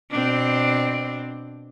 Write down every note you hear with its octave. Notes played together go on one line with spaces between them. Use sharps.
B2 C4 D4